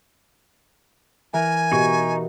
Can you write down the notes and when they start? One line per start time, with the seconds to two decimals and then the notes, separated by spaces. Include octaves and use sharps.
1.33 E3 A#4 G#5
1.72 B2 D#4 G4 C#6